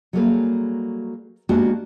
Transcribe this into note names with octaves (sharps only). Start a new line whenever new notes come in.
F#3 G3 A3 A#3 G#4 B4
G#3 A#3 B3 D4 F#4 G4